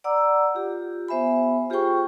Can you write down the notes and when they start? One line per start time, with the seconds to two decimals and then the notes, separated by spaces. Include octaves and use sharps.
0.04 D5 F#5 A#5 D6 E6
0.55 F4 G4
1.08 B3 C5 E5 G#5 B5
1.70 F4 G4 G#4 C5 G5 C#6